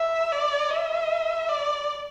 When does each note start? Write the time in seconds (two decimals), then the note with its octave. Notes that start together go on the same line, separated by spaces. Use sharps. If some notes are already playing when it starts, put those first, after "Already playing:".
Already playing: E5
0.31 D5
0.71 E5
1.49 D5